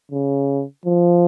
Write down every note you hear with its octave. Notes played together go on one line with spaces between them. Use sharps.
C#3
F3